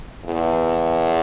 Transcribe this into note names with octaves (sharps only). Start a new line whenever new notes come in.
E2